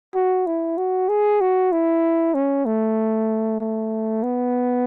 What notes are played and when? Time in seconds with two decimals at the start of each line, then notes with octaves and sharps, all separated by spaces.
0.15 F#4
0.47 E4
0.78 F#4
1.09 G#4
1.41 F#4
1.72 E4
2.34 C#4
2.66 A3
3.61 A3
4.23 B3